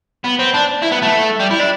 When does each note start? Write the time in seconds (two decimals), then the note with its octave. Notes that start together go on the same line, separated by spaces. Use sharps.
0.24 B3
0.39 C4
0.54 D4
0.83 E4
0.92 B3
1.02 A3
1.40 G3
1.51 E4
1.60 D4